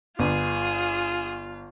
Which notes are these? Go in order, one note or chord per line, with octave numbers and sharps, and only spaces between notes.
G1 F4 G#4 B4 D#6